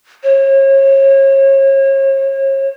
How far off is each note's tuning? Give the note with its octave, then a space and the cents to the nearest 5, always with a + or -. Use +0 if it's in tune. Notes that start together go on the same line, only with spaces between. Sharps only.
C#5 -35